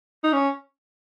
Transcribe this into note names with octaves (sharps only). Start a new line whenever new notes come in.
D#4
C#4